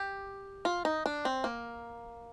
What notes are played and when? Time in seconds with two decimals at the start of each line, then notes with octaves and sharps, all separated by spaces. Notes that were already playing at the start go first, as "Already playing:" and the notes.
Already playing: G4
0.65 F4
0.85 D#4
1.06 D4
1.25 C4
1.44 A#3